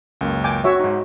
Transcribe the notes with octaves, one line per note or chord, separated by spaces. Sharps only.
C#2 F#2 A#3
G5 G#5 D6
F#4 C#5 E5
G#2 D#4